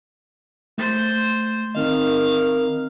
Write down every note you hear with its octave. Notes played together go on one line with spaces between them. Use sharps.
A3 C5 A6
D#3 C4 D#5 F5